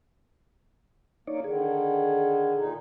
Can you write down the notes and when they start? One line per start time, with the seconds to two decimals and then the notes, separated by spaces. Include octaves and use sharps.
1.27 A#3 D#4 C#5 D5
1.44 D3 D#3 G#4
2.57 A#2 D#4